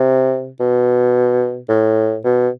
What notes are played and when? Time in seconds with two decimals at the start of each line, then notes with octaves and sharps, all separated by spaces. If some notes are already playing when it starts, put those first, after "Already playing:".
Already playing: C3
0.60 B2
1.69 A2
2.24 B2